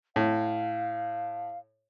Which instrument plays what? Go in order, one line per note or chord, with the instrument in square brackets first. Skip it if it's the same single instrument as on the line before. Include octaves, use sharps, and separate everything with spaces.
[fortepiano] A2 [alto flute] F5